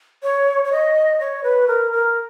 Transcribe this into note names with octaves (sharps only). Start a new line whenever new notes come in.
C#5
C#5
D#5
C#5
B4
A#4
A#4